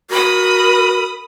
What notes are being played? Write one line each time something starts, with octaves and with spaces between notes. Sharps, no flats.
F#4 A#4 B5 D#6